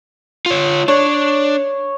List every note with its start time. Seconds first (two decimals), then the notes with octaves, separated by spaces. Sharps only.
0.46 F4 C#5
0.88 D4 C#5